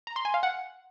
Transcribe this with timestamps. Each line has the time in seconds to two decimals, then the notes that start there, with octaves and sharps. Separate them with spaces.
0.07 A#5
0.16 C6
0.25 G#5
0.34 F5
0.43 F#5